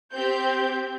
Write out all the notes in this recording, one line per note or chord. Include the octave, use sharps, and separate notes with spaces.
C4 G4 G6